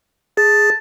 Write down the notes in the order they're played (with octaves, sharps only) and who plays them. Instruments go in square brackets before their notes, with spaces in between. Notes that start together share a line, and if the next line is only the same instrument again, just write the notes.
[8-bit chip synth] G#4 [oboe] A5